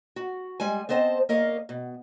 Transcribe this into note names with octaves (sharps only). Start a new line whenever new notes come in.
F#4
G3 G#3 G#5
B3 C4 C5 D#5 A5
A#3 A#4 C#5 D#5 F5
B2